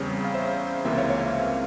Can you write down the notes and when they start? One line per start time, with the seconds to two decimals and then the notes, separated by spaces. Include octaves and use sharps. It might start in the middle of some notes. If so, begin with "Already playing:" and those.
Already playing: E2 C#3 G3 C4 C#5
0.24 F5
0.34 C5 E5
0.85 C#2 C3 E3 A#3 C5 E5
0.98 C#5 F5
1.10 C#5 F5